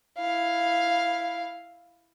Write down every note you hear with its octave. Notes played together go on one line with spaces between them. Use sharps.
E4 F5